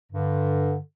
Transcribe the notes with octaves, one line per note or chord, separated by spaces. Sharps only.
G2 D3